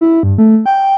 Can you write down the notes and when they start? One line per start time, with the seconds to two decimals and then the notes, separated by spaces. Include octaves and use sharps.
0.01 E4
0.23 G2
0.38 A3
0.66 G5